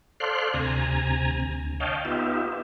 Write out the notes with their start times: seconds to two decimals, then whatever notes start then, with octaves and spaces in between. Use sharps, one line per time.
0.20 A4 C5 D5 F5 C6 F#6
0.54 D2 C3 G#5 A#5
1.40 D2
1.80 C#5 D#5 F5 G5 A5
2.05 B3 D#4 F4 G4 E5